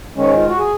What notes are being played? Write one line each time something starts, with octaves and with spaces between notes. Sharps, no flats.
G#2 D#3 G#3 C#4
F4
F#4
G#4